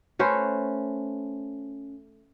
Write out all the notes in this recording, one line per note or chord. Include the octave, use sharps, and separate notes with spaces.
A3 C#4 B4 C5